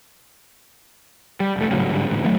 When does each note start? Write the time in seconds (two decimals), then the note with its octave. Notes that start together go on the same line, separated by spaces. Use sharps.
1.40 G3
1.56 E1 A3
1.70 G#1 A2 C#3 F#3
1.90 G#2 D3 E3 G3
2.08 A1 D2 A2
2.24 D#2 A2 F#3 A3